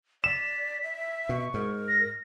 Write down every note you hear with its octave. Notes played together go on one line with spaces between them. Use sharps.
D5 B6 E7
E5
B2 C#6
G#2 A#4
A#6